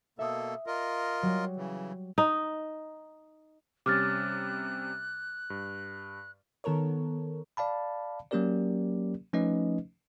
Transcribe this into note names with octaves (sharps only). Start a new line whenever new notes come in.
B2 A#3 A4 E5 D#6
F4 A#4 D#5
F#3 G3
C#3 E3
D#4
C3 G3 C#4 D6 F6 F#6 A6
G2
D#3 B3 A4 A#4 C#5
D5 F5 A5 B5
F#3 A#3 C#4 G4 A#4 D5
F3 A3 C#4 D#4 B4 D#5